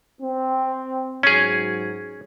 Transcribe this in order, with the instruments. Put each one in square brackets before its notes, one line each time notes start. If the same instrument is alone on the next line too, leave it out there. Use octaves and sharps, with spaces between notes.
[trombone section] C4
[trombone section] G#2 F#3 [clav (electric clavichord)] C#4 G#4